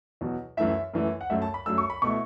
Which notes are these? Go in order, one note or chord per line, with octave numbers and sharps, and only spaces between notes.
E2 B2 F#3
F#2 E3 A3 E4 E5
F#2 E3 A3 E4
F#5
F#2 F#3 A3 E5
A5
B5
F#2 F#3 A3 E6
C#6
B5
B2 A3 E4 C#6